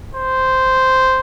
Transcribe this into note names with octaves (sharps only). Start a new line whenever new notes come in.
C5